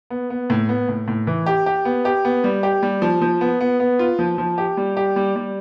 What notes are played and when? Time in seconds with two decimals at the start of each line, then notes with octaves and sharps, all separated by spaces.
0.10 B3
0.30 B3
0.50 A2
0.69 B3
0.89 A2
1.08 A2
1.27 E3
1.46 G4
1.66 G4
1.85 B3
2.05 G4
2.25 B3
2.44 G3
2.63 G4
2.83 G3
3.02 F3
3.22 F3
3.41 B3
3.60 B3
3.80 B3
3.99 F4
4.19 F3
4.38 F3
4.58 G4
4.77 G3
4.97 G4
5.16 G3
5.36 G3